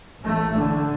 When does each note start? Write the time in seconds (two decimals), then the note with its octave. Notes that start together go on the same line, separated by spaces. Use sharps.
0.23 A1 A2 A3
0.57 D3